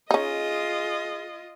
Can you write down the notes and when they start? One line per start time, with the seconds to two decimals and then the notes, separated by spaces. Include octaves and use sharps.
0.11 C#4 D#4 F4 G#4 D#5